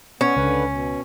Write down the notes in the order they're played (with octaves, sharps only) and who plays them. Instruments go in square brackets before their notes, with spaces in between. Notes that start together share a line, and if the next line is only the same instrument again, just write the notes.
[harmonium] B3 [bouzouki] C#4
[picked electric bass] C#2 [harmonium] D3 B4
[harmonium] B2